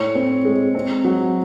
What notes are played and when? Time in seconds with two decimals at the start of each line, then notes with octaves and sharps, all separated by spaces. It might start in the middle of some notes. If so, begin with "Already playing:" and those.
Already playing: A2 C#5
0.15 C4
0.45 G#3
0.75 C4
1.05 F#3